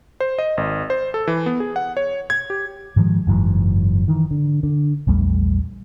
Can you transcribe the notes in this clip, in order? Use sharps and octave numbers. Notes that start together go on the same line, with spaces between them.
C5
D#5
G#1
C5
A4
E3
B3
G#4
F#5
C#5
G#6
G4
G#2 D#3 F3 G#3
F#1 G#2 E3 F#3
D#3 E3
D3
D3
A#1 E2 G3 A3